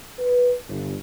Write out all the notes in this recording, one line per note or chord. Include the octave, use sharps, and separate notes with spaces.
B4
G1